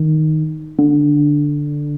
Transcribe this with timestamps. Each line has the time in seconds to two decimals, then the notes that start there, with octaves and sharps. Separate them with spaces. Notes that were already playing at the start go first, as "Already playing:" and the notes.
Already playing: D#3
0.79 D3